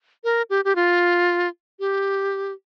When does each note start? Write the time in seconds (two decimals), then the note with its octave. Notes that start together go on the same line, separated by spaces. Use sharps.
0.24 A#4
0.50 G4
0.65 G4
0.76 F4
1.80 G4